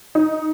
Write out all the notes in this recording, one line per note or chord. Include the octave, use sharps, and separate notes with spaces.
D#4